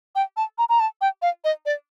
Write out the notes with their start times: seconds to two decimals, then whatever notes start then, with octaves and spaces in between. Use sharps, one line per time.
0.15 G5
0.37 A5
0.58 A#5
0.69 A#5
0.80 A5
1.01 G5
1.22 F5
1.44 D#5
1.66 D5